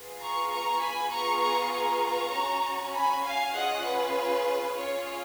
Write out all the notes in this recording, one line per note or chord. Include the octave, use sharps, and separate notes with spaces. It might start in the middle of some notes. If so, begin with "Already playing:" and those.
Already playing: B3 F4 G#4
A#5 C#6
A#5 C#6
G#5 B5
B3 F4 G#4 A#5 C#6
A#5 C#6
A#5 C#6
C#4 F#4
G#5 B5
F5 G#5
C#4 F4 G#4 D#5 F#5
B4
C#4 F4 G#4 C#5